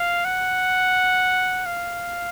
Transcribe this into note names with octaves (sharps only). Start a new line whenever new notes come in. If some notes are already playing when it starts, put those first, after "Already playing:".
Already playing: F5
F#5
F5